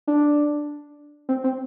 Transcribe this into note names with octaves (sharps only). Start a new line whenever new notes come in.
D4
C4
C4